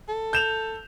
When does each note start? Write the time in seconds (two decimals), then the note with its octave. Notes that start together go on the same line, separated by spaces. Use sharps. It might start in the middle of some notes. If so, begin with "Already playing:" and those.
0.08 A4
0.33 G6 E7 F7